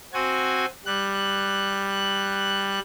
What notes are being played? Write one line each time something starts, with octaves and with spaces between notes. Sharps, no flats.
C4 F#4 G#5
G3 F#6